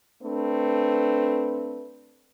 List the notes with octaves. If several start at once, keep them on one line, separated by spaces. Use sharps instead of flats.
A3 C4 D4 B4